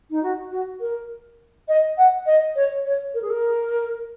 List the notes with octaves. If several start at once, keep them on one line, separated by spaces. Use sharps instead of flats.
D#4
F#4
F#4
A#4
D#5
F#5
D#5
C#5
C#5
A#4
G#4
A#4